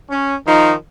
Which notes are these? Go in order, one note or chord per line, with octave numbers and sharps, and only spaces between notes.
C#4
D#3 F3 D#4